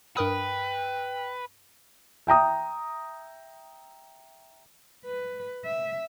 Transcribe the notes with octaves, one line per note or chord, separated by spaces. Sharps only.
G2 A#4 B4 G5 D#6
E5 G5 A#5 D#6
B4
E5